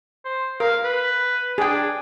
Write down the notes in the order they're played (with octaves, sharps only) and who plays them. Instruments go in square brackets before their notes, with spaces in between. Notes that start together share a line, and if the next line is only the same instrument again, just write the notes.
[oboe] C5
[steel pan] A#4 [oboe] F5
[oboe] B4
[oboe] D4 [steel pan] G#4 G5